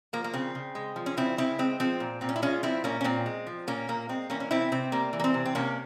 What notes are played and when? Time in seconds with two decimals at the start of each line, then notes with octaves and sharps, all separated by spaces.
0.13 F3 A#3
0.24 A#3
0.34 C#3 C4
0.55 C#3
0.75 G#3
0.96 F3
1.06 C#4
1.17 C#3 C4 E4
1.38 C#3 C4 E4
1.59 G#3 C4
1.80 F3 C4
2.00 A#2
2.21 A#2 C4
2.29 C#4
2.36 E4
2.42 G#3 C#4 F4
2.63 F3 C4 E4
2.84 A#2 A#3 C#4
3.01 C#4
3.04 A#2 C4
3.26 G#3
3.47 F3
3.67 A#2 A#3 C#4
3.88 A#2 A#3
4.09 G#3 C4
4.30 E3 A#3 C#4
4.40 C#4
4.51 C3 C4 E4
4.72 C3 C4
4.92 G3 A#3
5.13 E3
5.20 A#3
5.24 C4
5.34 C3
5.45 C4
5.55 C3 A#3 C#4